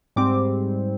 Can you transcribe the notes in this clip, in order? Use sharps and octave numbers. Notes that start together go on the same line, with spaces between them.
G#2 G3 C4 D6